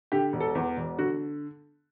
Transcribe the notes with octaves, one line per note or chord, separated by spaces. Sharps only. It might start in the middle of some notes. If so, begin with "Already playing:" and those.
D3 G4
E1
A4
E2
E1
D3 F#4